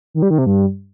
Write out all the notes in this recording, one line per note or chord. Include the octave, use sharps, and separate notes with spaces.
D#3
G3
D#3
C3
G2